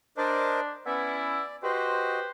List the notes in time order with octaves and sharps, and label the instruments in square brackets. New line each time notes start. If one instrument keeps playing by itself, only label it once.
[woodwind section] D4 [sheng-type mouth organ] A#4 C5 D#5
[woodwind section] B3 C#4 E4 [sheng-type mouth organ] D5
[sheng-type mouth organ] F#4 D#5 [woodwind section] G4 B4 C5